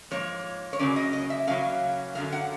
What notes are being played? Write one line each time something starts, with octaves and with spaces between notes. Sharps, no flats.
G#2 F3 A#3 C#5
C#5
C#3 F#3 A#3 C#4 D5
D#5
D#5
E5
C#3 F#3 A#3 C#4 F5
F#2 D3 F#3 F5
F#5